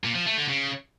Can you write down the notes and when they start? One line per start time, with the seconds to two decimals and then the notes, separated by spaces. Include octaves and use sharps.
0.04 A#2
0.15 F3
0.26 A3
0.37 D3
0.48 C#3